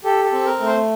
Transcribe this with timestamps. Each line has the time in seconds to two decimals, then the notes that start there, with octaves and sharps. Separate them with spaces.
0.04 G4 A4
0.25 A4
0.32 C4
0.46 A#4
0.59 A3
0.66 C5